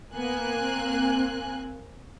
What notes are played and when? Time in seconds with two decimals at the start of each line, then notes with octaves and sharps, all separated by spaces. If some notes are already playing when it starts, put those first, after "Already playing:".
0.15 A#3 B3 G#5 F#6
0.59 C4